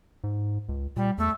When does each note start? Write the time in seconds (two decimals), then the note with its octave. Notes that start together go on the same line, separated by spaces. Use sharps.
0.24 G#2
0.69 C#2
0.96 A#2 G3
1.18 E2 A3